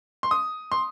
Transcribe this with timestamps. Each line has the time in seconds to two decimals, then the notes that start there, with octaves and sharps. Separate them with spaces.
0.23 C6
0.31 D#6
0.72 C6